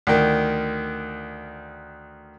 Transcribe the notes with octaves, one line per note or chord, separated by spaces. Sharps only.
D2 D#3